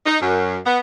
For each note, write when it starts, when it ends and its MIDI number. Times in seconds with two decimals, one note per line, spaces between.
0.05 0.20 63
0.21 0.56 42
0.65 0.78 59